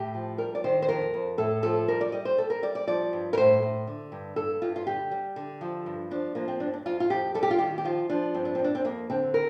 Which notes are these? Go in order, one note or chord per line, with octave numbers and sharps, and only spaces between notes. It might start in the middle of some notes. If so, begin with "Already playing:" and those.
Already playing: A2 G4
F3
G3 A#4
D5
D#3 C5
C5
F2 A#4
F2
A2 A4
F3 A4
G3 A#4
D5
G3 D#5
C5
G3 A4
A#4
G3 D5
D5
F3 D5
G2
A#4
A2 C5
A2
D3
G2
G2 A4
G2 F4
F4
D3 G4
G3
D3
F3
G2
F3 D4
F3 A#3
C4
G2 D4
D4
F2 F4
F4
F2 G4
G3 A4
G4
F4
D#3 G4
G4
F3 F4
F3 D4
G2 C4
D4
G2 C4
D4
C4
F2 A#3
D3 C4
A#4